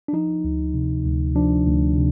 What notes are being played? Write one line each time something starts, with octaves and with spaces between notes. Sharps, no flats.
D4
F3 D#4
D2
C3
D2
F3 D4
D2
C3